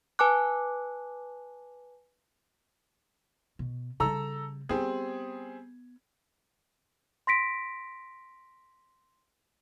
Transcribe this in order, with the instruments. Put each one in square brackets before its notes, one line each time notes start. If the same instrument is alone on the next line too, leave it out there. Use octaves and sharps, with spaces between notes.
[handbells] B4 G#5 A5 D6 F#6
[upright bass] B2
[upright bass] C#3 G3 [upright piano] A4 A#5 E6
[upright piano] G3 C4 G#4 [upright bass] B3
[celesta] C6 A#6 B6 D7